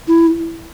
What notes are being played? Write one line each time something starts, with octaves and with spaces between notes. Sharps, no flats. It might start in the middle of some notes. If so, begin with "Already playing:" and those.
E4